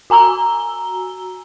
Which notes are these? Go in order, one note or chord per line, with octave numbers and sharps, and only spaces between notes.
F#4 G#5 A#5 E6 G7